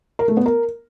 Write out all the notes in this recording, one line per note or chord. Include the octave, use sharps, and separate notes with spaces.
A#4
A3
B3
A#4